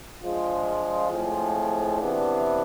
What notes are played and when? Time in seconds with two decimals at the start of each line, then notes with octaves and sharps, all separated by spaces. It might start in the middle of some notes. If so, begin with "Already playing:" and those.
0.21 F3 G#3 D4 F4
1.10 A2 F3 G#3 C4 G#4
1.99 C3 E3 B3 D4